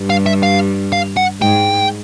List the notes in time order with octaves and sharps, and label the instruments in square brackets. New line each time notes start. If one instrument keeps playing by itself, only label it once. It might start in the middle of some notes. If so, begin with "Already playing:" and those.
Already playing: [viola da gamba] G2 G3
[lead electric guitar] F5
E5
F5
F5
F#5
[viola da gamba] G#2 G#3 [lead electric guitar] G5